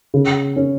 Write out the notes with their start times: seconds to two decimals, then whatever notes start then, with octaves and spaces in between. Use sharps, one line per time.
0.14 C#3
0.56 C#4